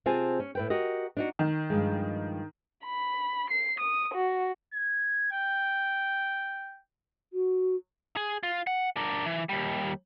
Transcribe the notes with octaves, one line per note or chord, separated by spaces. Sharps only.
C3 C4 F4 G#4 G#5 A5
C#4
A2 B4 G5
F#4 G4 A#4 D#5
D4 D#4 F#4
D#3
G2 F3 G#3
B5
C7
D#6
F#4
G#6
G5
F#4
G#4
F4
F#5
D4 A#4
E3
D#2 G3